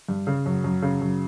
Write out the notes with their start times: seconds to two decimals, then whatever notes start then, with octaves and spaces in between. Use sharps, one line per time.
0.09 G2
0.27 C#3
0.46 F#2
0.64 F#2
0.82 C#3
1.01 F#2